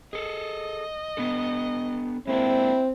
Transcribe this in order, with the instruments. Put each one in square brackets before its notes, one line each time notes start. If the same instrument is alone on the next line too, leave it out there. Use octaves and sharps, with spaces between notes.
[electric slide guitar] G#4 A4 [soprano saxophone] D#5
[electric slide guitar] B3 D4 A4
[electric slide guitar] G#3 A#3 D4 [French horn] C4 [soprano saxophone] E4